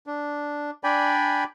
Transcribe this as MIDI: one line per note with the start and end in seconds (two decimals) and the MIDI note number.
0.07 0.71 62
0.84 1.44 62
0.84 1.44 74
0.84 1.44 79
0.84 1.44 80
0.84 1.44 83